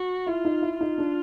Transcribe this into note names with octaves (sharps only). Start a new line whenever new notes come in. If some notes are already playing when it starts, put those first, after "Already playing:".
Already playing: F#4
E4 F4
D#4
E4
D#4 F4
D4